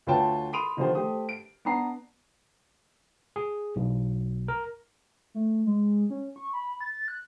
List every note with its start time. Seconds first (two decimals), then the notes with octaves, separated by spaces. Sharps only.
0.07 D2 F4 B4 C#5 G5 A5
0.53 B5 C6 D#6 D7 D#7 F7
0.77 D3 D#3 F3 D#4 G4 C5
0.95 A3 G4 C5 D#6
1.29 D7
1.65 B3 D4 A#5 C7
3.36 G#4
3.76 B1
4.48 A#4
5.35 A3
5.66 G#3
6.10 C#4
6.36 C#6
6.53 B5
6.81 A6
7.08 F#6